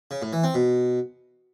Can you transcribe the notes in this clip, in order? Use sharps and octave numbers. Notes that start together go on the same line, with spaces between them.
C#3
A2
E3
C4
B2